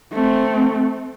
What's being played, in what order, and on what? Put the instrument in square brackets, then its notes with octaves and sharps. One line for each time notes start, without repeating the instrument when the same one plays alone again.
[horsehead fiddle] A3 C4